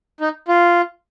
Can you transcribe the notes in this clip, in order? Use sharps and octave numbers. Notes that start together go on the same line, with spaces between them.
D#4
F4